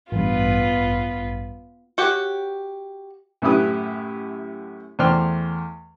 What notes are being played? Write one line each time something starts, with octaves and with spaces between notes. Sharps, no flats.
A1 G2 B3 F4 B4
F#4 G4 C#5 F#5
F#2 A2 E4 G4 B4 D#6
E2 A3 C5 D5 G5 F6